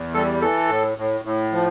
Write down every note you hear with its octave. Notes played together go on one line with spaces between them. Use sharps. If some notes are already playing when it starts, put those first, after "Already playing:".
Already playing: E2
G3 A4
E3 A4
A2
A2
A2
F3